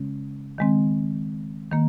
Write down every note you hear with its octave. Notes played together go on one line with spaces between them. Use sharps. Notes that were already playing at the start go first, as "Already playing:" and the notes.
Already playing: C#3 G#3 C#4
D#3 G#3 C4
D#3 A#3